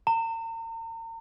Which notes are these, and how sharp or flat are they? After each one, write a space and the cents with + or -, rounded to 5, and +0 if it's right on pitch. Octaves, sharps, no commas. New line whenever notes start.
A#5 -40